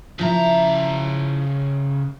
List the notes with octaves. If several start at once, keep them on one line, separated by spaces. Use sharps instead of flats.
C#3 F3 E4 A#5